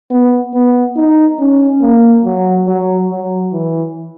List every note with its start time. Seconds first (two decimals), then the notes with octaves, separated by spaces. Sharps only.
0.11 B3
0.54 B3
0.96 D#4
1.39 C#4
1.81 A#3
2.25 F#3
2.67 F#3
3.10 F#3
3.53 E3